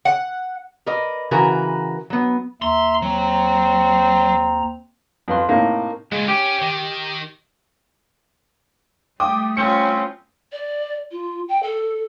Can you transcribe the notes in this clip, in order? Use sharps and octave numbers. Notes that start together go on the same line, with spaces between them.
F#5
A#4 B4 D5 D#5
C#3 E3 F#4 A#4 B4 A#5
F#3 B3
D#2 E5 A#5 C6
F#3 C4
F2 B4 C6
A2 C3 A#3 D#4
A#2 C#3 G#3
C#4 G4
D#3
G3 A3 G5 D6 D#6
C4 C#4 F4 C#7
D5
F4
G5
A4